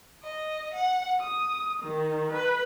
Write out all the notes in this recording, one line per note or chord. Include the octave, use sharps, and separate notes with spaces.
D#5
F#5
D#6
D#3
B4